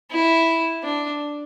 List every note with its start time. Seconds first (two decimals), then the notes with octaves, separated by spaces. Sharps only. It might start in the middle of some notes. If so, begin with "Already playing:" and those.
0.11 E4
0.83 D4